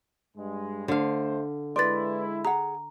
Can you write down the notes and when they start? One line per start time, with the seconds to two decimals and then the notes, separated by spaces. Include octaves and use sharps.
0.37 G2 G#3
0.88 D3 A3 C5 F5
1.76 G#3 E4 B4 D5 C6 A6
2.45 G#4 F#5 A#5